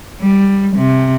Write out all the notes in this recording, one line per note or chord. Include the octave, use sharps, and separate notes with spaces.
G3
C3